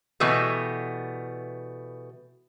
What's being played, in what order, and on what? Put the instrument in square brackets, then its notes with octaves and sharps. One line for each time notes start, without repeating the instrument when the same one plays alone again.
[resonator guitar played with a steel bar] B2 E3 G3 A3 B3